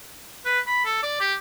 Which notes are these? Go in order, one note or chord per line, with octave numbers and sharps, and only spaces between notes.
B4
B5
A4
D5
G4